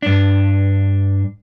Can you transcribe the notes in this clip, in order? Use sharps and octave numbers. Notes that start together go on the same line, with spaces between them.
G2 D4